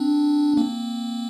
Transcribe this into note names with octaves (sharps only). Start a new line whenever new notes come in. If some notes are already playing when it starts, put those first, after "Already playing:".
Already playing: C4 D4
A#3 C4